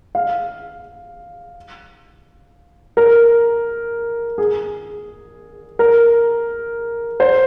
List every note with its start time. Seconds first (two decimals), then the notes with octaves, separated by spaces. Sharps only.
0.15 F5
2.97 A#4
4.38 G#4
5.79 A#4
7.20 C5